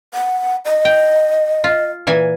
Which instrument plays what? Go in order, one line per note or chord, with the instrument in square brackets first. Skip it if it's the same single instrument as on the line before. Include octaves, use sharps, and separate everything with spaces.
[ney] F#5
D#5
[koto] G5
F4
A#2 E3 G#5